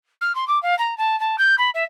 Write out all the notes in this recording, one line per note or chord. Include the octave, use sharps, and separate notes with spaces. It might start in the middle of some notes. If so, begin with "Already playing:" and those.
F6
C6
D6
F5
A#5
A5
A5
G6
B5
E5